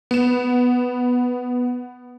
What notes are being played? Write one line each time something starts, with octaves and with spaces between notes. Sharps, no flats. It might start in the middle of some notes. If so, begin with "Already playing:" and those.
B3 E7